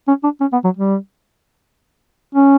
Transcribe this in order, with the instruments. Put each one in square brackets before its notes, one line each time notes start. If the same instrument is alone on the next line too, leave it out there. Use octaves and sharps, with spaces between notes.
[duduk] C#4
D4
C#4
B3
F#3
G3
C#4